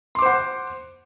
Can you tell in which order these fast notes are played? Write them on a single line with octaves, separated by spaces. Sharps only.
C6 D6 C5 F#5